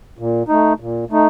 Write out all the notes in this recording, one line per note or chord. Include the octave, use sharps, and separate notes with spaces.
A#2
A3 D#4
A#2
A3 D#4